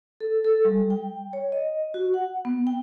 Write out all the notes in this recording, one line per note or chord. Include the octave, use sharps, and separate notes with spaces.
A4
A4
G3
G5
C#5
D#5
F#4
F#5
B3
G5